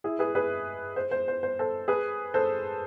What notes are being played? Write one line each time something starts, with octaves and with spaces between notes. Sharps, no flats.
E4 G#4
G#4 B4
G#4 B4
C5
C5
C5
C5
A4 C5
G#4 B4
A4 C5